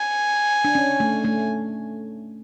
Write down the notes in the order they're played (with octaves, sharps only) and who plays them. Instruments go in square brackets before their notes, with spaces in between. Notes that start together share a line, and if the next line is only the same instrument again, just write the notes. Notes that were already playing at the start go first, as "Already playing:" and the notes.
Already playing: [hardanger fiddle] G#5
[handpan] D4
C#4
A3
A3